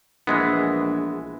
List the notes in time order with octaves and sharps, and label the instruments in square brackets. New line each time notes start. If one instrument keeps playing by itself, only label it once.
[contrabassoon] A#1 [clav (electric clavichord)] E3 G#3 B3